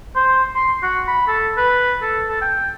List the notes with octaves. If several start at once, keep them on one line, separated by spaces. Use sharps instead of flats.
C5
C6
F#4
B5
A4
B4
A4
A4
G5